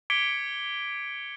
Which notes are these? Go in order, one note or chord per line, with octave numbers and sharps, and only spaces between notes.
D6 G#6 B6 C#7 D7 G7